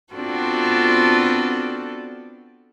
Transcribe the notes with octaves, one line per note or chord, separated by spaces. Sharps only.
B3 C4 D4 F4 F#4 A4